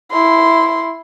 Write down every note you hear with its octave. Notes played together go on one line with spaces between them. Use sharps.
E4 C6